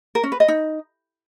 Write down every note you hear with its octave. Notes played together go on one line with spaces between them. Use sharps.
A#4
C#4
B4
D#5
D#4